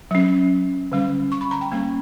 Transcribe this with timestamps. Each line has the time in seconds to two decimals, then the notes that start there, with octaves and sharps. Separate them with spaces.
0.11 F#3 C#4
0.92 D3 G3 C#4
1.32 C#6
1.41 B5
1.51 A#5
1.61 G5
1.72 G3 A#3 C#4